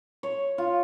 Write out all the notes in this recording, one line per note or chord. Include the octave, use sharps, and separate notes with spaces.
C#5
F4